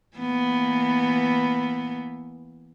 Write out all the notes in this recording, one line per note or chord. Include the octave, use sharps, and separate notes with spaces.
E3 A#3 B3